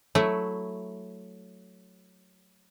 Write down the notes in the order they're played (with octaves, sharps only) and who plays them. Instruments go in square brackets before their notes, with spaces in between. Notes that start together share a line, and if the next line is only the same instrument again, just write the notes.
[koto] F#3 A3 E4